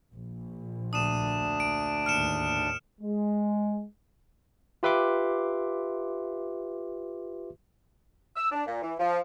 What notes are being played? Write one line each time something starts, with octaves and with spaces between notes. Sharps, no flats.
A#1
D2 D4 D#6 D#7 E7
D7
D#2 A2 F6 C#7 E7
G#3
F4 G4 B4 E5 C6 D6
E6
D4
A#2
E3
F3